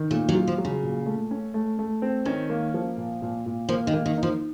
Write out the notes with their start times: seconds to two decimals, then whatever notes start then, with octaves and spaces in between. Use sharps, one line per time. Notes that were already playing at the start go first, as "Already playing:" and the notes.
Already playing: D#3
0.10 A#2 A3
0.29 F#3
0.35 F4
0.47 F3
0.58 F#3
0.65 C#3
0.83 A#2
1.06 A3
1.31 C#4
1.54 A3
1.79 A3
2.02 C4
2.25 D#3 C#4
2.49 A#3
2.74 F3
2.97 A#2
3.22 A#2
3.46 A#2
3.69 F3 A#3
3.87 D#3
3.94 A#3
4.06 D#3
4.18 D#4
4.23 F3